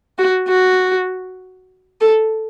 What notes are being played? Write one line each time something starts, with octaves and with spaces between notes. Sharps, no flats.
F#4
F#4
A4